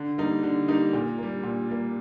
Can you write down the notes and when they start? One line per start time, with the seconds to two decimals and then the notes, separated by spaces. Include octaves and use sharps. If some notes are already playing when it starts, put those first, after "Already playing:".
Already playing: D3
0.18 G3 A#3 D#4
0.43 D3
0.68 G3 A#3 D#4
0.93 A#2
1.18 G3 A#3
1.43 A#2
1.69 G3 A#3